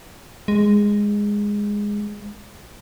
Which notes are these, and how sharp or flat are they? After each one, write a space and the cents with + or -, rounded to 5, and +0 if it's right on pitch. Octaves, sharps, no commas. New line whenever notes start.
G#3 -10